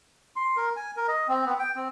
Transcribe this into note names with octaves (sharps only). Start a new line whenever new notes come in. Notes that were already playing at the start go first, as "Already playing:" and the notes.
C6
A#4
G#5
A#4
D#5
C4
B3
G5
C4